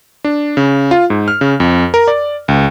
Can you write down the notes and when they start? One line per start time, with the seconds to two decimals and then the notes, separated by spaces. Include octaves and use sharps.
0.24 D4
0.57 C#3
0.91 F4
1.10 G#2
1.28 F6
1.41 C#3
1.60 F2
1.94 A#4
2.08 D5
2.48 C#2